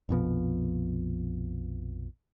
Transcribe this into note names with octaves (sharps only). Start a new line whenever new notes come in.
A#1 F2 B2 F3